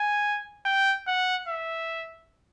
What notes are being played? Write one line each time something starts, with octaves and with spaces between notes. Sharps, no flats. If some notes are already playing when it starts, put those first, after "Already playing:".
Already playing: G#5
G5
F#5
E5